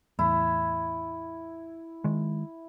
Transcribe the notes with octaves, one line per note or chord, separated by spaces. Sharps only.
E2 A2 E4
D#3 G#3